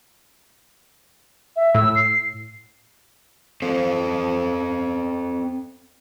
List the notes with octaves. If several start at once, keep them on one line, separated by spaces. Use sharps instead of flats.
E5
A2 E6
C7
C4 A4 C5